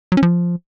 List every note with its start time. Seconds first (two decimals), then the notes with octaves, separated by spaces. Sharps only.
0.12 F#3
0.17 C#4
0.23 F3